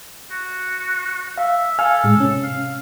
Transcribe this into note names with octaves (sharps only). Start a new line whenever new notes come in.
F#4
E5 F5
A4 F5 G#5 F6
A2 G#3
C3 C#4
F5